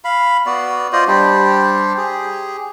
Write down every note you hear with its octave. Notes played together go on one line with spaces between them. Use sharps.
F5 B5
B3 F#4 D5
F4 C5 D5 D#5
G3 D4 G4 C5
G4 G#4